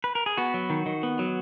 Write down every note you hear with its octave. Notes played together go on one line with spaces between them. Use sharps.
B4
A#4
G#4
B3 F#4
F#3
D#3
D#3
B3
F#3